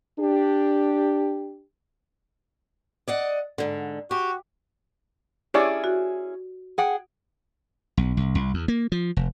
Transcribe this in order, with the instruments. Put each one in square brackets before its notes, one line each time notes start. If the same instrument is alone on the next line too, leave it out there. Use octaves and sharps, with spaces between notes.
[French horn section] D4 G4
[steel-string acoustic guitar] D5 D#5 F#5
G#2 D3
[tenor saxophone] F#4 [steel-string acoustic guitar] G4
[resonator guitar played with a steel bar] C#4 E4 G#4 [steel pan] G4 C#5 D5
[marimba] F#4
[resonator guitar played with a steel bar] G#4 F#5 G5
[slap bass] B1
C2
C2
E2
A#3
F3
F1